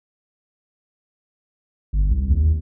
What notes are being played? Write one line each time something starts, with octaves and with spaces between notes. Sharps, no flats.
G1
C2
D#2